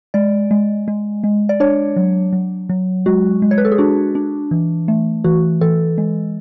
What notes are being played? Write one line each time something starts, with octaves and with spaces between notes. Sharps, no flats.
G#3 D5
G#3
G#3
G#3
D5
D4 C#5
F#3
F#3
F#3
G#3 F#4
G#3
C#5
B4
A4
G#4
D4 F#4
D4
E3
A3
E3 F#4
E3 A4
G#3